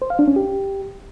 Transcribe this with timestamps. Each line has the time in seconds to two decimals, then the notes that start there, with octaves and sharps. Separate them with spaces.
0.02 C5
0.10 F5
0.19 D4
0.28 C#4
0.36 G4